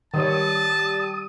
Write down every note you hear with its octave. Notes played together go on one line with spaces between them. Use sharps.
D#3 G3 C#5 A5 D#6